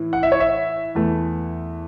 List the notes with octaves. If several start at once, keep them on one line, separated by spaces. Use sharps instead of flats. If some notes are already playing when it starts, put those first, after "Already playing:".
Already playing: A2 E3
F#5
E5
C#5
E5
E2 E3 A3